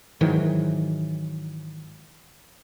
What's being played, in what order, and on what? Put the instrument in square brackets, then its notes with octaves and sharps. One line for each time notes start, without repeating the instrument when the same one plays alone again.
[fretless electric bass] G#2 D#3 E3 F#3